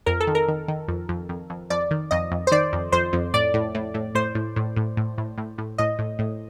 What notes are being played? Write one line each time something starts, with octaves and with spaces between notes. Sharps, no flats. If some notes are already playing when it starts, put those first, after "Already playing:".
F2 A#4
A4
D#3
A#4
D#3
D#3
F2
F2
F2
F2
F2 D5
D#3
F2 D#5
F2
C5
D#3 D5
F2
F2 C5
F2
A2 D5
A2
A2
A2
A2 C5
A2
A2
A2
A2
A2
A2
A2
A2 D#5
A2
A2